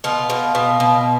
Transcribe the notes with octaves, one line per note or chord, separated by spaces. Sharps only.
B2 F4
B2
B2
B2